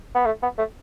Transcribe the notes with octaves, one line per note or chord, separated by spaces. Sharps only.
B3
A3
B3
A3